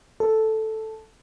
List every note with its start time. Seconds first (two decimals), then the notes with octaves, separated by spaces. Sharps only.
0.20 A4